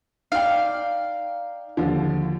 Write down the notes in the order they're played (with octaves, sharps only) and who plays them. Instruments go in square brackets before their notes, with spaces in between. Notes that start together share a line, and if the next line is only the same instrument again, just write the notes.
[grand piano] D#4 G5 [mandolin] D5 F5
[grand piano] D#2 D3 F3